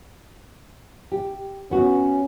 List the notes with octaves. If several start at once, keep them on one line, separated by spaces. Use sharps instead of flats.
G4
B3 C#4 F#4